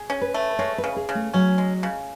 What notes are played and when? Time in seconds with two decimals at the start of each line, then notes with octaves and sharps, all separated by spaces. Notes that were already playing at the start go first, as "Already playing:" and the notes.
Already playing: G#4
0.10 C#4
0.21 B4
0.34 A3
0.59 G#3 C#5
0.78 B4
0.84 C#3
0.96 G#4
1.09 C#3
1.15 A3
1.34 F#3 C#4
1.58 G#3
1.83 C#3